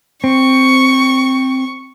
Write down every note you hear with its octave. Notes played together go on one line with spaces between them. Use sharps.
C4 C#6